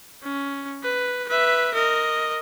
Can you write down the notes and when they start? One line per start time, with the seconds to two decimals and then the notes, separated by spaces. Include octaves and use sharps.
0.23 C#4
0.83 B4
1.29 B4 E5
1.74 A#4 D#5